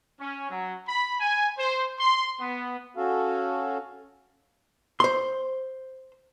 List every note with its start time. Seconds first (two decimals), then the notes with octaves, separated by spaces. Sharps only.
0.20 C#4
0.50 F#3
0.87 B5
1.20 G#5
1.57 C5
2.00 C6
2.40 B3
2.97 C#4 F#4 A4 F5
5.00 C5 C6